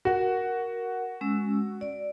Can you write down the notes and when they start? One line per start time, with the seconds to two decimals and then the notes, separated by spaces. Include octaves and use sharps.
0.05 F#4 A#4 F#5
1.21 G#3 C#4 E6
1.81 D5